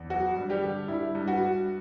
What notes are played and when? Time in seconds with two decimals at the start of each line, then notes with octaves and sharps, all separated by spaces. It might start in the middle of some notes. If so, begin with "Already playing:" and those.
Already playing: E2
0.10 F#3 F#4
0.36 G2
0.49 G3 G4
0.63 D3
0.88 G2 E4
1.15 G2
1.28 F#4
1.41 G2